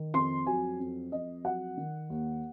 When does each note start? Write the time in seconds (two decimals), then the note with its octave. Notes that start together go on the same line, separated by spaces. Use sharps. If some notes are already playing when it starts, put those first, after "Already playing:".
Already playing: D#3
0.14 F2 C6
0.47 F#3 G#5
0.79 F2
1.12 F2 D#5
1.44 F#3 F#5
1.77 D#3
2.10 D#2